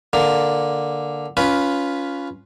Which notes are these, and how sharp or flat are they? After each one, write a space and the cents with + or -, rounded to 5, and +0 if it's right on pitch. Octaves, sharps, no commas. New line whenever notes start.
D3 +0 A#3 +0
C#4 +20 F4 +0 B4 +0